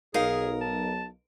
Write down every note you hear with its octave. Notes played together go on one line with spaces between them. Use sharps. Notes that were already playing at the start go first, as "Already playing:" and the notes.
B1 D#4 G#4 A#4 F5
A5